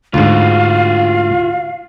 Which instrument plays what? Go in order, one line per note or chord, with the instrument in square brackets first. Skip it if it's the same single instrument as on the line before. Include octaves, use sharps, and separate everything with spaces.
[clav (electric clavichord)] D2 G#2 [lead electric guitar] F4 F#4 [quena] F5